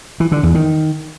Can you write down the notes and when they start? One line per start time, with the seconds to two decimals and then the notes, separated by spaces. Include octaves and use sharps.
0.20 E3
0.32 D3
0.43 E2
0.55 D#3